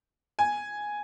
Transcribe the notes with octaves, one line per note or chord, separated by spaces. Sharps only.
G#5